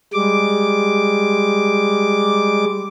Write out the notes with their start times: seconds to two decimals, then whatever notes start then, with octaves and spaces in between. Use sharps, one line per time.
0.14 G3 G#3 D6